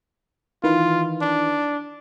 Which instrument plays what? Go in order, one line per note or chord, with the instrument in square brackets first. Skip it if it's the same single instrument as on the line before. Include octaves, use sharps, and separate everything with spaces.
[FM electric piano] D#3 E3 B4 [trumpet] F4
[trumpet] D4